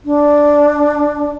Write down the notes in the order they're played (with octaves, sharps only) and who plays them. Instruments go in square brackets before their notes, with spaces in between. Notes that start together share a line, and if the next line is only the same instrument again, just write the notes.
[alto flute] D4